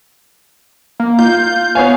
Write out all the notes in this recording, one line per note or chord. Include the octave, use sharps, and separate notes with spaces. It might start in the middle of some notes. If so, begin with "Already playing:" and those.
A#3
F4 G6
B3 C#5 F5 G#5